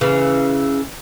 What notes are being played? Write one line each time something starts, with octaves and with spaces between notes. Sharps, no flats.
C#3 E3